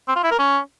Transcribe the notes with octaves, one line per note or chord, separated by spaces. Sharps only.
C4
F4
E4
A#4
C#4